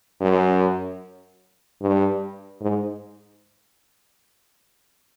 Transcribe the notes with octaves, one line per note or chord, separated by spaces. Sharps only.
F#2
G2
G#2